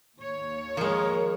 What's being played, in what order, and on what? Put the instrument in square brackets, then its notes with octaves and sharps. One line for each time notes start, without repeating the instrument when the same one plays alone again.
[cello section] D#2 C#5
[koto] F3 G#3 [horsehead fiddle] A#4